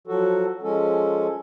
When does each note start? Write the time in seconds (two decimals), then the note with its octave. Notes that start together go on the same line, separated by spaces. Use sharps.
0.07 F3 F#3 F#4 A4
0.63 F3 G#3 C#4 A4